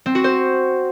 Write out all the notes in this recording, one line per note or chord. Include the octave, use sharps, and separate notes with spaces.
C4
F#4
C5